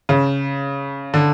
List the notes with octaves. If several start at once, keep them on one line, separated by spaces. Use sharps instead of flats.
C#3
D3